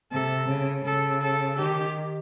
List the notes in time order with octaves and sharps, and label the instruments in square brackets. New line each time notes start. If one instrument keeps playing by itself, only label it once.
[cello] C3 [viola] A4
[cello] C#3
[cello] C#3 [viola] A4
[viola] A4
[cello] D#3 [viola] G4